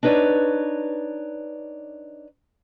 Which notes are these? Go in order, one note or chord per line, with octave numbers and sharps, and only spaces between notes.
D4 D#4 B4 C#5 D5